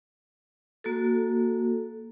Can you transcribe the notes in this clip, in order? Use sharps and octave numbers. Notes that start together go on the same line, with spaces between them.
A#3 F#4 A4